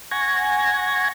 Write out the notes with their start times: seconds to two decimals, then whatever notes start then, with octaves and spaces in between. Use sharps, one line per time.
0.11 F#5 G#5 C#6 G#6 A#6